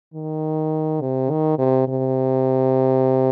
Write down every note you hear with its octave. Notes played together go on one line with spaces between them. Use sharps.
D#3
C3
D#3
C3
C3